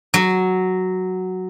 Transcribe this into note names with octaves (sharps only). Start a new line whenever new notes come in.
F#3